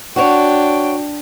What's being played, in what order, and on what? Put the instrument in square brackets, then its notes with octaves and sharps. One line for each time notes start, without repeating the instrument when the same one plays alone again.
[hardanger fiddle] D4 G5 [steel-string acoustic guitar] F#4 C#5